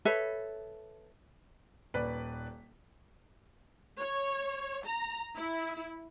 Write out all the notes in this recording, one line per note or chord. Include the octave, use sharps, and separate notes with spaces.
A4 B4 C#5 E5
D#1 B4 D5 B6
C#5
A#5
E4